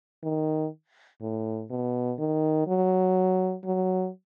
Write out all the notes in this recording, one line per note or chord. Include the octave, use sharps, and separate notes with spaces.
D#3
A2
B2
D#3
F#3
F#3